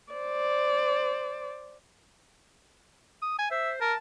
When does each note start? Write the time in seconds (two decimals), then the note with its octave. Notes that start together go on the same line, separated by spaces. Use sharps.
0.13 C5 D5
3.22 D#6
3.39 G#5
3.51 C5 E5
3.81 A#4 A5